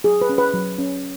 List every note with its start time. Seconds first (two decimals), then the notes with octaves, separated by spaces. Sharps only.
0.04 F#3 G#4
0.22 B4
0.29 C#4
0.38 B4
0.54 F#3
0.78 C#4